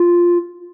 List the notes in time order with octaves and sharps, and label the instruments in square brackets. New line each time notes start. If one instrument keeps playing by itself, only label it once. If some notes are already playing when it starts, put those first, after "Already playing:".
Already playing: [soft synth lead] F4